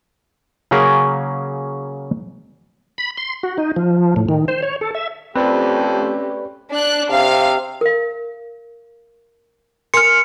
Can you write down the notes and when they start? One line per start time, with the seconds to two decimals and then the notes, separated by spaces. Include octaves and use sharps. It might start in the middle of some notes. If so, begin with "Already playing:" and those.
0.71 C#3 F#3 A#3 C#4 G#4 A#4
2.98 B5
3.17 C6
3.43 F#4
3.58 D#4
3.76 F3
4.16 A2
4.29 D#3
4.48 C5
4.63 C#5
4.81 A4
4.95 E5
5.36 F2 A3 C4 C#4 G4 B4 D5
6.72 D4 F#6
7.10 C3 F5
7.81 A#4 F5
9.94 A#4 G#5 C6 F6 C#7